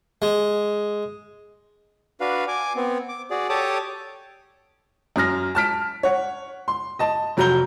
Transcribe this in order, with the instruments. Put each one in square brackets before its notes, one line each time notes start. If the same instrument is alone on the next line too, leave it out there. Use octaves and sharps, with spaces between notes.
[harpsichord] G#3
[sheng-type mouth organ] D4 F#4 B4 F5
G#5 D6
B3 C4
D6
F#4 G#4 D5
G4 A4 C#5 A5 D6 D#6
[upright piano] F#2 F#3 F6 A#6
A5 F6 B6 D7
C#5 F#5
C6
D#5 A5
F1 F#3 F#4 A#5 G6 G7